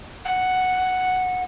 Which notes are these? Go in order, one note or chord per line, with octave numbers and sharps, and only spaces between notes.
F#5